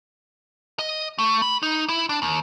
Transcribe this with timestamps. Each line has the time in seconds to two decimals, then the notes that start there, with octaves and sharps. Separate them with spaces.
0.79 D#5
1.18 A3
1.42 B5
1.63 D#4
1.89 E4
2.09 D4
2.22 D#2